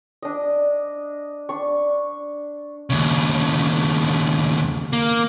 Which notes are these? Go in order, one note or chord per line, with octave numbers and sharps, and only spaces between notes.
D4 D#5
D4 C#6
D#2 C#3
A#3